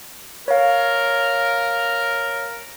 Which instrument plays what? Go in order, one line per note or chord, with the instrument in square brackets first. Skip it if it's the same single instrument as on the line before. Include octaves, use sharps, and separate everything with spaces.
[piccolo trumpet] A#4 [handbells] C#5 F5